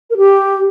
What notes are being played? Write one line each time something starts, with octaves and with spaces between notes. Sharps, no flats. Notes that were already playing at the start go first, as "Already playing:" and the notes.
A#4
G4